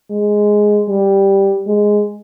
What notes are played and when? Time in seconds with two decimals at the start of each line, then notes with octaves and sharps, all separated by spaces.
0.11 G#3
0.89 G3
1.67 G#3